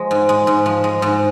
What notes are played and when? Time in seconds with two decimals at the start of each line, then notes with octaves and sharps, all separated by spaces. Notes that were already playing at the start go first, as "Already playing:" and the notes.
Already playing: F3 G#3
0.11 G#2
0.29 G#3
0.47 G#2
0.66 F3
0.84 G#3
1.02 G#2